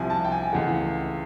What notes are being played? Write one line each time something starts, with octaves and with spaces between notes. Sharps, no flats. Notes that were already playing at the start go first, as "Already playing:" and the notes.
Already playing: C2 C3 F3 G#5
A5
G5
G#5
C#2 C#3 E3 A3 F#5